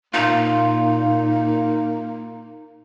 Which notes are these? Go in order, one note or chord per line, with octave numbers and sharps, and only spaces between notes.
A#2 A#3 D#4 F4